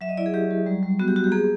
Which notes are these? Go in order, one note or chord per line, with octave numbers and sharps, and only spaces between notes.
F#3 E5
D#5
E4 D5
G#4
F#3 G4
F#3
G3
G3
B3 F#4
G4
F#4
G4
A#3 G#4